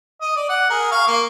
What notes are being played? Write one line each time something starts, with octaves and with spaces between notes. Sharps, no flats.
D#5
D5
F#5
G#4 A#4
F5 C#6
A#3